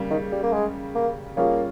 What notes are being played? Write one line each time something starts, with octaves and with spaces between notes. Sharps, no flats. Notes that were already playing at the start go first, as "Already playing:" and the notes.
Already playing: C#3 G3 A#3
D#3
G3
A#3
G#3
A#3
G3 A#3 C#4 F4 G#4 C#5